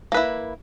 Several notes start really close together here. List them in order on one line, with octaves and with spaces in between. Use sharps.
A#3 B4 E4